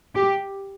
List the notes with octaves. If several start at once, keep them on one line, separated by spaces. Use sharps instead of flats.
G4